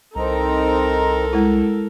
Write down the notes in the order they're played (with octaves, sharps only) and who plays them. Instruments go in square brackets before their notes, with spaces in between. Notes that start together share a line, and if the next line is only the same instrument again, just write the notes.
[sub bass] C2 [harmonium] C4 D#4 A#5 [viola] A4 A#4
[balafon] G#3 E4